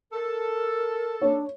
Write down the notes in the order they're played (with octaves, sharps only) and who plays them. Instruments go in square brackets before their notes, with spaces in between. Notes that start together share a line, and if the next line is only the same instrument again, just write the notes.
[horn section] A4 [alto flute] A#4
[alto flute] D4 [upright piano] C#5